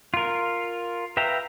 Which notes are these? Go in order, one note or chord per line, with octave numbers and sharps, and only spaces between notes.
F4 A#4
B4 E5 F5 G5 A#5